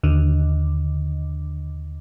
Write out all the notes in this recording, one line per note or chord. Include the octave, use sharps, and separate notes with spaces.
D#2 D3